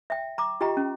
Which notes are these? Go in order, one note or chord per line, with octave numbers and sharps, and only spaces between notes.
E5 G5
A#5 D6
F4 G4 D#5 G5 A#5
C#4